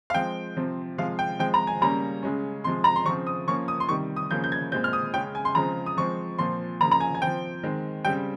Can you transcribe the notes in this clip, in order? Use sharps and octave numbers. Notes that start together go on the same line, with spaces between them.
F5
F3 G#3 C4 G5
C3 F3 C4
C3 F3 G#3 F5
G5
F3 G#3 C4 G5
A#5
G#5
C#3 G3 A#3 C#4 A#5
C#3 G#3 C#4
C3 F3 G#3 C6
A#5
C6
C#3 F3 C4 C#6
D#6
F3 A#3 C#4 C#6
D#6
C6
C3 D#3 G3 C#6
D#6
C#3 F3 A#3 C#4 G6
G6
G#6
A#2 G#3 C4 G6
F6
D#6
C#3 G#3 C#4 G5
G#5
C6
C#3 F3 G#3 C4 A#5
D#6
F3 G#3 C4 C#6
A#2 F3 C4 C6
C#3 F3 A#3 A#5
A#5
G#5
G#5
F3 C4 G5
D#3 G#3 C4
C#3 G3 C4 G5